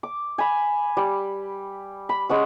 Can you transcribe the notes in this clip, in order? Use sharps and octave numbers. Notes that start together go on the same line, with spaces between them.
D6
G#5 B5
G3
B5
G#3 C#4 F#5